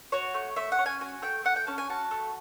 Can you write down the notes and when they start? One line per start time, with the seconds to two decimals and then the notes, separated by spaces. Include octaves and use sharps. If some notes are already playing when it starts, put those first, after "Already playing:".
0.12 F#4 C#5
0.34 A3
0.56 A3 E5
0.72 F#5
0.79 C#4
0.86 G#5
1.01 F#4 G#5
1.22 A3 G5
1.44 A3 F#5
1.56 G5
1.67 C#4 A5
1.78 G#5
1.89 F#4 A5
2.11 A3